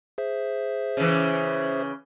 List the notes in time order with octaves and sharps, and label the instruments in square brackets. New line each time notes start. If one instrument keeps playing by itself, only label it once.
[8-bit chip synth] G#4 C5 E5
[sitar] C#3 E3